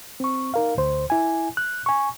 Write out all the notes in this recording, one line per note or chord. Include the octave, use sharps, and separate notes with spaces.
C4 C#6
D#4 A#4 F5
D2 C5
E4 G#5
F#6
G#5 C#6